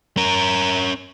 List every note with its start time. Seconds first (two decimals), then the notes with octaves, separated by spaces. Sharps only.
0.17 C#4 A#4